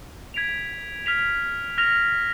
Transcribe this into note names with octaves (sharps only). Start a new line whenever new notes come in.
G#6 B6 D7 F7
F6 B6 F7
F6 A#6 F7